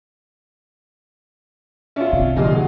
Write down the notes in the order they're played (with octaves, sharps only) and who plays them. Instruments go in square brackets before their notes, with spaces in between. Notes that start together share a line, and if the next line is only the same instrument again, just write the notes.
[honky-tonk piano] C#4 D4 [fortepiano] F4 E5
[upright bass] C3
[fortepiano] G#1 A#2 G3 [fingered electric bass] D3 F3 [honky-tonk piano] D#4 F4
[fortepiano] F#4 G#4